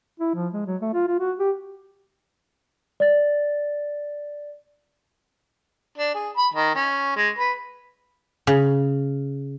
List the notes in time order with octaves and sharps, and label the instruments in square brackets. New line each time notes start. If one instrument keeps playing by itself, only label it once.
[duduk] E4
F3
G#3
F#3
A3
F4
F4
F#4
G4
[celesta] D5 A6
[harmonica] D4
G#4
B5
D#3
C#4
G#3
B4
[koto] C#3